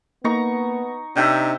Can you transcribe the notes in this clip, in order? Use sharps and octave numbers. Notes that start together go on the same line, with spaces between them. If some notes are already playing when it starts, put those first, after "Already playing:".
A#3 B3 D#4 A#5 C#6
C3 D4 D#4 E5 F#5 G5